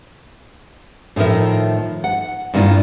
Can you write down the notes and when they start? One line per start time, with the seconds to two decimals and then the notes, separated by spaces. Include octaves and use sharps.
1.16 A2 D#3 F3 A#4 E5
2.04 F#5
2.54 G2 A#2 D#3 C#4 E4 F4